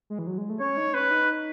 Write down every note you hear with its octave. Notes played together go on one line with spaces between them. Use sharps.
G#3
E3
F#3
G#3
A3
C#4 C#5
D#4
C#4 B4
D#4